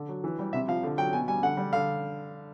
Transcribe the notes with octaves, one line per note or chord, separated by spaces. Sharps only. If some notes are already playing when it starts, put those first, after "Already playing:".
Already playing: D3
F#3
E3
G3
C3 E5
F3 F5
D3
F#3 G5
B2 G#5
G3 G#5
D3 F#5
G3
D3 F5